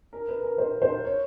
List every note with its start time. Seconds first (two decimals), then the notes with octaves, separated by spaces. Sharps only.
0.13 A#4
0.28 B4
0.43 A#4
0.58 C5
0.82 C5
1.05 C#5